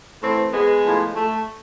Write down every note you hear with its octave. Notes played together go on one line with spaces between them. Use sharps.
A2 E3 A3 C4
G#3 B3
A2 F3
A3